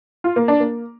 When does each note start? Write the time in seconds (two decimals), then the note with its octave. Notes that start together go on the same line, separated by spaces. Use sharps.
0.24 F4
0.36 A#3
0.48 D4
0.60 A#3